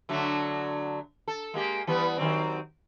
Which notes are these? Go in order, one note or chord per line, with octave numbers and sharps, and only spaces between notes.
D3 F#3 A3
A4
G#3 A#3 G4
E3 G3 B3
D#3 F#3 C4